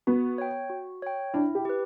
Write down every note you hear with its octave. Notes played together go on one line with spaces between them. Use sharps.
B3 F#4
C#5 G5
F#4
C#5 G5
D4 E4
G4
G4 B4